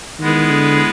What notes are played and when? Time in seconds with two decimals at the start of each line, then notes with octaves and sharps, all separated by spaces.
0.19 D#3 G#3 B3 E4 G#4 B4
0.50 D3